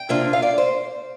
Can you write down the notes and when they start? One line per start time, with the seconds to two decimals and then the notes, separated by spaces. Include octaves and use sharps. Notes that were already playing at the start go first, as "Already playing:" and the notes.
Already playing: G5
0.09 C3 A#3 D4 F4
0.33 F5
0.42 D5
0.58 C5